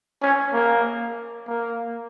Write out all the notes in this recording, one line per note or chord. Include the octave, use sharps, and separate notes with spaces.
C#4
A#3
A#3